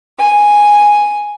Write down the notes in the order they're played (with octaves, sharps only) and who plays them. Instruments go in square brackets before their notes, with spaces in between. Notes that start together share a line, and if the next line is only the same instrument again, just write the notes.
[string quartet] G#5